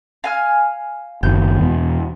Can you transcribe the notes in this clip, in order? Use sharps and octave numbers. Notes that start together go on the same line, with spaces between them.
F5 G#5 F6
F#1 D#3 G6
E2 B2